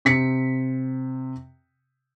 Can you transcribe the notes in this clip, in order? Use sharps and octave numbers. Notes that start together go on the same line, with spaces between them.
C3 B6 C#7